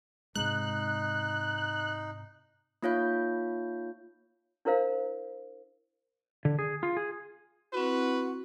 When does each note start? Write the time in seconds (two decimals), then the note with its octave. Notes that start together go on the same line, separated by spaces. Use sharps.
0.36 G#2 C3 G#3 D#4 F#6
2.83 A#3 D#4 F4 C#5 F5 G6
4.65 D4 E4 A#4 C5 F5
6.45 D3
6.59 G#4
6.83 F4
6.97 G#4
7.73 C4 E4 F#4 B4